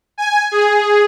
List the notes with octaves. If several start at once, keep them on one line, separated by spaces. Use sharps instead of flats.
G#5
G#4